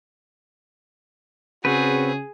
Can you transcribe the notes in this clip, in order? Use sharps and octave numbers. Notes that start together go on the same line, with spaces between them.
C#3 C4 F#4 G#4 B4